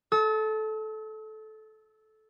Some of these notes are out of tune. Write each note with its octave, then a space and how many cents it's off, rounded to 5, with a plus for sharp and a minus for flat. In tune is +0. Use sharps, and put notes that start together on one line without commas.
A4 -15 E6 -45